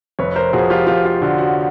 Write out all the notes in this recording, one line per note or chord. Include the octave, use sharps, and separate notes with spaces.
F1 B4 C#5
A#4 C5
F3 F#4 G#4
F4 G4
F1 F4 G4
F4
D3 F#4
F#4